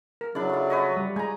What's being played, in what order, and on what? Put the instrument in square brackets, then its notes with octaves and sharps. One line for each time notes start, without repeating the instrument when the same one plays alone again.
[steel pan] A#4
[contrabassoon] C#3 [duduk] F#3 [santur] D4 E4 D5
[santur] A3 F4
B4 C#5 D#5
[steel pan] G3
[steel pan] G#3 [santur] G#5 A#5